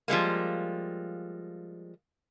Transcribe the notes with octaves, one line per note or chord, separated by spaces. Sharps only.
F3 G3 G#3 A#3